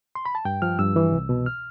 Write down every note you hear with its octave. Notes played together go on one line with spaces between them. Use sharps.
C6
B5
A5
G2 G5
F3 F6
G2 E6
E3
C2
B2
F6